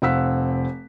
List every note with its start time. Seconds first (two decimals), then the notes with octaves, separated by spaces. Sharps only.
0.02 F1 C4 F5 F#5 E6 B6